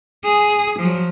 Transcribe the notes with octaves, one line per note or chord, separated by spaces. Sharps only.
G#4
F3 F#3